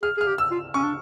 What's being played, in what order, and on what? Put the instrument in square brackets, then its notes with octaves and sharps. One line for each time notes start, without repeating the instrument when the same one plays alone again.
[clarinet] G#4 [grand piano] F6
[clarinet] G#4 [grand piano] F6
[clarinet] G4
[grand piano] E6
[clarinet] F4
[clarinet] C#4 [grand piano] C#6
[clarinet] D4